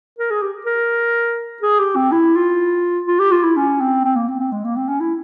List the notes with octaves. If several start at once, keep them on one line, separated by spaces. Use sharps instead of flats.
A#4
G#4
G4
A#4
G#4
G4
C4
E4
F4
F4
G4
F4
E4
C#4
C4
C4
A#3
C4
C4
G#3
A#3
C4
C#4
E4